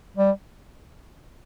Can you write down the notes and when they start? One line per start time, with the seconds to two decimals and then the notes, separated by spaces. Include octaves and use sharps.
0.17 G3